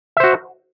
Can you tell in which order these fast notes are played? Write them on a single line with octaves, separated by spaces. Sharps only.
E5 C5 F#4